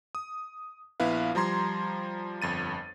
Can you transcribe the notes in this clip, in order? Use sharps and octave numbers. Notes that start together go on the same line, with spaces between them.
D#6
A#1 B3 E4 B4 F5
F3 G3 A#5 C6 G#6
G1 F2 A6 D#7